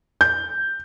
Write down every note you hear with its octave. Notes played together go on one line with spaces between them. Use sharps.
G6